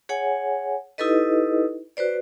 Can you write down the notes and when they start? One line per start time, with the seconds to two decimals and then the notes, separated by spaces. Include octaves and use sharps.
0.09 G#4 C#5 F#5 G#5
0.98 D#4 E4 G4 A4 B4 D#5
1.97 F#4 B4 C5 D5